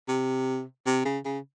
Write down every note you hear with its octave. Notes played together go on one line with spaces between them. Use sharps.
C3
C3
C#3
C#3